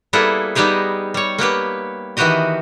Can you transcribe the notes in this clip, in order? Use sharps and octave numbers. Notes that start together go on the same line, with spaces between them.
G3 A#3 B3 E4 G#4 A4
G3 B3 D#4 G4 G#4
G3 C#5
A#3 B3 G4 B4
D#3 E3 B3 F#4 G4 D#5